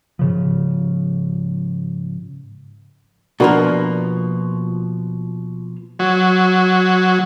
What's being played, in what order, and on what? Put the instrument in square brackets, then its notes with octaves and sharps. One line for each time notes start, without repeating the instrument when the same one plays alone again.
[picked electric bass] G#2 C#3 F3
[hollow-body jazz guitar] B2 F3 A#3 [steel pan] D4 F#4 A#4
[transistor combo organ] F#3